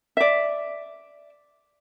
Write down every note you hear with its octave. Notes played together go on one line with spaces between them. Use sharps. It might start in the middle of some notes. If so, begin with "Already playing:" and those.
D5 E5